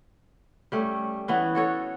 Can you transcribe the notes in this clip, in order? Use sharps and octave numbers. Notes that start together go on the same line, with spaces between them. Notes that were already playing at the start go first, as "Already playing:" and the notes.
G3 A3 C#4
E3 B3 C#4
F#4 A4 C#5